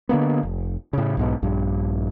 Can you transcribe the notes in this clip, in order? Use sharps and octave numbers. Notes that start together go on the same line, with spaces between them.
D3 F#3 A#3 B3
F1
A2 C#3
B1 G#2 B2
A#1 G2